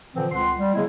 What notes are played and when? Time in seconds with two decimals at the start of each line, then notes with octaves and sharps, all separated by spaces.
0.15 A#2 D3 E3 F3 C4
0.32 C#2 C4 F#5 C6
0.58 G3
0.74 C#3 F#3 G#3 B3 E4